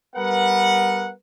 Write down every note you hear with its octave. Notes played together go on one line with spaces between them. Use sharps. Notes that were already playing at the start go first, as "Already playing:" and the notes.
G3 B3 A#4 B4 F#5